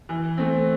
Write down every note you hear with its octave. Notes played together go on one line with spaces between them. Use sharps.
E3
A3 C4